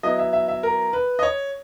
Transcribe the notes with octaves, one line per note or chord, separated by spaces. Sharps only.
F#3 B3 E4 D#5
E5
E5
E5
A#4
B4
D#5
C#5